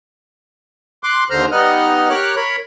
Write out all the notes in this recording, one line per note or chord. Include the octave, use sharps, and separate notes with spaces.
C6 D6 F#6
D#2 D3 C5 A#5 F6
G3 B3 D#4 D#5 F#5 F6
G4 A#4 C#5 F6 F#6
A#4 C#5 B5